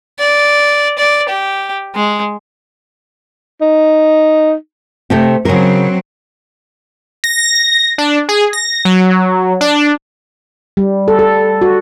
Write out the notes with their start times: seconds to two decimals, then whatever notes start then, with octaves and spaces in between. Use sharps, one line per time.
0.19 D5
0.98 D5
1.29 G4
1.95 G#3
3.61 D#4
5.10 C3 A3 C4
5.45 C#3 F#3 C4 A#4
7.24 A#6
7.98 D4
8.29 G#4
8.53 A#6
8.85 F#3
9.61 D4
10.77 G3
11.08 A4
11.19 A4
11.62 F#4